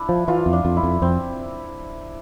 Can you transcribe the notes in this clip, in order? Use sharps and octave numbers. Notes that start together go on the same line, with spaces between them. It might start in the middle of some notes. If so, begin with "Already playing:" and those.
Already playing: D4 E4
F3
E3 F4
F2
D4
F2
E4
F2
F2 C4